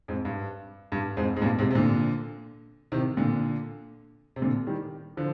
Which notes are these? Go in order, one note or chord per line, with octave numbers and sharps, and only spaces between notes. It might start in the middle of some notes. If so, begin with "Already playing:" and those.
F2 G#2
G2
G2
F2 G#2
G#2
G2 A#2
G#2 C3
C3
A#2 D3
C3 D#3
A#2 D3
C3
A#2 D3
D#3 G3
D3 F3